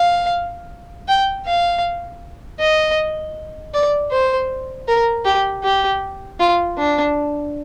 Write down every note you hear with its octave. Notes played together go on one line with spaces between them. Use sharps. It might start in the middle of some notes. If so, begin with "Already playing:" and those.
Already playing: F5
G5
F5
D#5
D5
C5
A#4
G4
G4
F4
D4